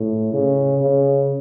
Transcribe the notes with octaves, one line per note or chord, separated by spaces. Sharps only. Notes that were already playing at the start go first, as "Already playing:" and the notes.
Already playing: A2
C#3
C#3